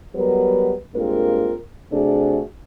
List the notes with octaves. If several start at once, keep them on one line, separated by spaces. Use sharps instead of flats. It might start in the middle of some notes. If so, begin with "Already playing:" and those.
F#3 G3 B3 A#4 B4
G2 G#3 A#3 C4 F4 A#4
C3 A3 D4 F#4 G#4